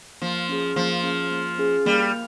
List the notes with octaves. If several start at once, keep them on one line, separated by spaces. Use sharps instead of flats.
F3 A#3
C#4 G#4
F3 A#3
C#4 G#4
A#3
C#4 G#4
G3 A#3